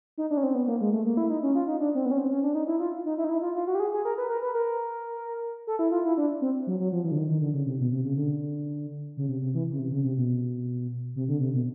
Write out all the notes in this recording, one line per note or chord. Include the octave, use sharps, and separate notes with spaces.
D#4
D4
C#4
C4
B3
A#3
G#3
A3
A#3
E4
D#4
C#4
F4
D#4
D4
C4
B3
C#4
C4
C#4
D4
D#4
E4
F4
D#4
E4
D#4
E4
F4
F4
F#4
G4
G#4
G#4
A#4
B4
A#4
B4
A#4
A4
E4
F4
E4
D4
C4
F#3
F#3
F3
E3
D3
D#3
D#3
D3
C#3
C3
B2
C3
C#3
D3
C#3
C3
C3
E3
C#3
C3
C#3
C3
B2
C3
D3
C3
B2